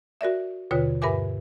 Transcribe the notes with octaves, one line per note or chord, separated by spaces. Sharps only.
F#4 A#4 D5 E5
D#2 B2 D3 F4 B4 C#5
G2 A#4 B4 E5 G#5 D6